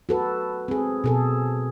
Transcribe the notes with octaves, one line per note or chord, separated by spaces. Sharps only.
F#4 A4 B4
C4 G#4
B2 G#4 A4